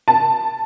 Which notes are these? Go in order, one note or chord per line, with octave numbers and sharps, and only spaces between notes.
A5